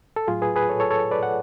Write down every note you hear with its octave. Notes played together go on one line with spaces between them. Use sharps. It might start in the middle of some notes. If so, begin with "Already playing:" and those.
A4
A2 F#3 F4 G#4
G#4 B4
G#4 B4
A4 C#5
A4 C#5
A4 C#5
B4 D5
F#5